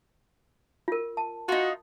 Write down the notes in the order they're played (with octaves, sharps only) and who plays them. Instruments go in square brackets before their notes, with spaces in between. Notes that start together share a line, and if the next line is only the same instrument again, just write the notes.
[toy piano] F4 A#4
A5
[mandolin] D#4 F4 [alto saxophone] F#4